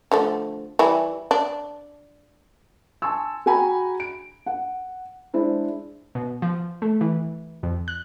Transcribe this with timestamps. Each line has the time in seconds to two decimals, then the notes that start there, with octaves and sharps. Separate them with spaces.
0.11 D3 F3 A3
0.79 E3 G3 E4
1.31 D4
3.02 G#5 A5 C6 C#6 E6
3.46 F#4 G#4 G5 G#5 A#5 B5
4.00 D7
4.46 F#5
5.34 G#3 D4 E4 C5
6.15 B2
6.42 F3
6.82 A3
7.01 E3
7.63 F2
7.88 F#6